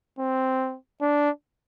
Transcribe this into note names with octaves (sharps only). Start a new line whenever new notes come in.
C4
D4